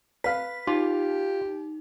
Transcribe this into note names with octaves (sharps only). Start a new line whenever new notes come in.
B4 F5 B6
D#4 F4 G4